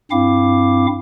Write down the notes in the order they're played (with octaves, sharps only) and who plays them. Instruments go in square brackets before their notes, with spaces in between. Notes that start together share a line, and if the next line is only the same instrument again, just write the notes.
[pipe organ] G2 C4 E4 F5 D6